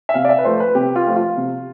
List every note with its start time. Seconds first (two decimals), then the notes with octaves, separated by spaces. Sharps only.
0.09 E5
0.14 C3 F5
0.25 D5
0.29 E5
0.38 B4
0.45 F3 A3 C5
0.60 B4
0.75 C3 G4
0.96 F4
1.06 F3 A3
1.16 F4
1.37 C3